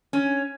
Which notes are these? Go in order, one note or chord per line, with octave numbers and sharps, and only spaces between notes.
C#4